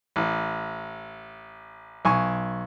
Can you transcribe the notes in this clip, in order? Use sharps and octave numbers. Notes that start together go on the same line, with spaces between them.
A1
B1 G#5 C#6